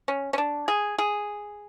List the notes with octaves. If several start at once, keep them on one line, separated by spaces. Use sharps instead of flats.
C#4
C#4
D4
G#4
G#4